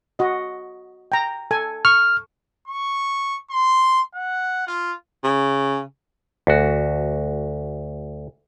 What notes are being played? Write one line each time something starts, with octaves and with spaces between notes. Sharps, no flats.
F#4 D#5
G5 A#5
A4 G#5
C#6 F6
C#6
C6
F#5
F4
C#3
D2 F#4